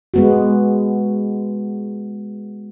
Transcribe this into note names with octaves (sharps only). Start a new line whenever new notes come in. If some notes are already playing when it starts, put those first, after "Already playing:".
G#3 B3 F#4